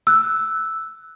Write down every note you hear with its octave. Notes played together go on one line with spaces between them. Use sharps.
E6 F#6